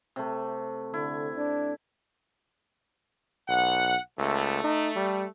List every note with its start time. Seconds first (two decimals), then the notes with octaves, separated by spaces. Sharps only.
0.16 C3 A3
0.94 D3 E4
1.37 D4
3.49 B1 F#5
4.18 C#2 A3
4.64 D#4
4.96 G3